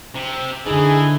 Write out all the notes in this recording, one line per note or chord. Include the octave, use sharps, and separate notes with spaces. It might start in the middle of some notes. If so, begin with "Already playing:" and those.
C3
D3 E3 D#4 G#4